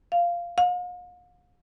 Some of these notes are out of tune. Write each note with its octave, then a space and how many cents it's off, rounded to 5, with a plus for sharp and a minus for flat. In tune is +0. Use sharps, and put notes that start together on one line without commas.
F5 -10
F5 +45